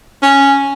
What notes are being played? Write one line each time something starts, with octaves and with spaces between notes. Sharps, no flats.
C#4